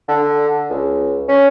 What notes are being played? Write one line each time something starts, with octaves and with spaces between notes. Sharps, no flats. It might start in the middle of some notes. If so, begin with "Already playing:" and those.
D3
C#2
C#4